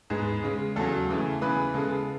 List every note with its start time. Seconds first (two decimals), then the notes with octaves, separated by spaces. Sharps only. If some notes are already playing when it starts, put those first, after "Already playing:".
0.10 G#2 G#3 B3 G#4
0.43 C#3 G#3 C#4
0.76 E2 C#3 F#3 A4
1.09 C#3 E3 A3
1.41 C#3 E3 B3 B4
1.74 C#3 G#3 B3 A4